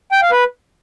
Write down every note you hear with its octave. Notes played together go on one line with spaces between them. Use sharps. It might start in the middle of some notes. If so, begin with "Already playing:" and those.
G5
F5
B4